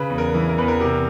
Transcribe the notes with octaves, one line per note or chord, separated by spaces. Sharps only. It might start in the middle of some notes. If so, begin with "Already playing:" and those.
Already playing: C#3 B4
E2
A#4
E3
A#4
E2 B4
A#4
C3 A#4